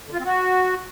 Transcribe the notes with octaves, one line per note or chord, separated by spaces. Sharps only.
D3
F4
C4
F#4